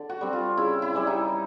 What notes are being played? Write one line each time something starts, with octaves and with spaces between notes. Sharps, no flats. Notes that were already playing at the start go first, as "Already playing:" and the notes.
Already playing: D3
F#4
G3 C4
F4
C#3 E4
E4
E3 G3
D#4